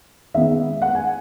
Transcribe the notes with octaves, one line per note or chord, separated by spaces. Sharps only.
D#3 G#3 B3 D#4 E5
F#5
G#5